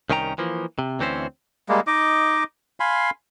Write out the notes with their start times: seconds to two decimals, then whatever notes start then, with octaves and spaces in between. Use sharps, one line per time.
0.10 C2 D#3 C#4 G5 A#5
0.38 E3 F3 A#3
0.79 C3
0.99 D2 E3 C4 C#4 C5
1.69 G3 G#3 A#3
1.87 D#4 D#5 D6
2.80 F5 G#5 B5 C6